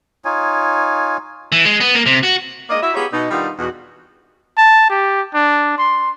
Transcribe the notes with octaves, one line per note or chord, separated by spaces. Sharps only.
D#4 F4 C#5 G#5
E3
G#3
B3
A#3
C3
F#4
G#3 A#3 D5 D#5
E4 F#4 E5
B3 D#4 F4 G4 G#4 C#5
B2 D#4
D#3 G3 B3 D4 D#4 F4
E2 B2 F#4
A5
G4
D4
C6